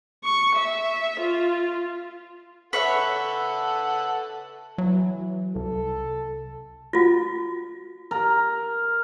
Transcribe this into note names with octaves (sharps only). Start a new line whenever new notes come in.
C#6
E5
F4
A4 B4 C#5 E5 F#5
E3 F#3
C2 A4
F4 F#4
A#4